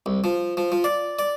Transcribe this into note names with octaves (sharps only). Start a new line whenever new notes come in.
C2
F3
F3
F3
D5
D5